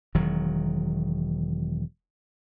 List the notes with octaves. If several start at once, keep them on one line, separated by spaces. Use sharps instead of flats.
E1 D#3 F#3